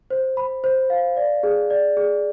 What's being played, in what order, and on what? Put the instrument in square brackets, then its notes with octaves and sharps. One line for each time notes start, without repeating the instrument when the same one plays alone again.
[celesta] C5
B5
C5
F5
D5
G#4
D5
G#4